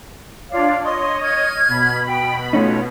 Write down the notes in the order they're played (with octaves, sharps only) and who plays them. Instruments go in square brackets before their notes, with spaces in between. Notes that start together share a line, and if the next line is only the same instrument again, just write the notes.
[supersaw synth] D4 F4 D5 [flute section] C#5 F5
[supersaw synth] C#5 D#5 [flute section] C6
[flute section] F6 G#6
[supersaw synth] B2 B5
[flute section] G5
[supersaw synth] B2 [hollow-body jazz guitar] A3 C#4 D#4 [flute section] F4 C#5 F#5